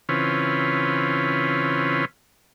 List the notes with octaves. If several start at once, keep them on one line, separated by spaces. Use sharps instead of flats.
C#3 E3 C4 C#4 F4 B4